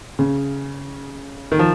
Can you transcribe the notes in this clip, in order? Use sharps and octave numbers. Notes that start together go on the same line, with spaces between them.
C#3
D#3
F3